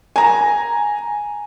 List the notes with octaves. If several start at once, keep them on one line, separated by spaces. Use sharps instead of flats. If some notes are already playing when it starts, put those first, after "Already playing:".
G#5 A#5